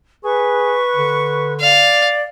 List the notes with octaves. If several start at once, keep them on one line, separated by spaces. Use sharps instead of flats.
G#4 B4 C#6
D3
D5 F5